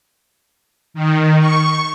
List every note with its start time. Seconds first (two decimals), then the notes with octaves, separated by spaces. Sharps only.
0.94 D#3
1.39 C#6